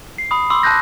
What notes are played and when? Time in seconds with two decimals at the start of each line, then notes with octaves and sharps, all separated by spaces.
0.18 C7
0.31 B5 D#6
0.50 B5 C6 D6 E6
0.63 A5 F#6 G6 A#6